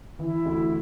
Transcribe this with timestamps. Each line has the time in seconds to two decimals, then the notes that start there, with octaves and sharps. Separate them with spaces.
0.19 E3 E4
0.46 D2